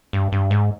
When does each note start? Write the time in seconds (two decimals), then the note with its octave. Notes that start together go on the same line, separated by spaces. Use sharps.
0.13 G2
0.32 G2
0.51 G#2